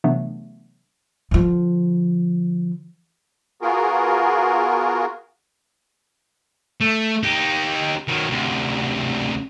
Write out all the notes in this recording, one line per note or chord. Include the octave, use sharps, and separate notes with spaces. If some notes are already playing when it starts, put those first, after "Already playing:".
C3 E3 F#3 A3 B3 D4
D3 F3
B3 F4 F#4 G#4 A#4
A3
D#4 G4
D#3 F#3
D2 C3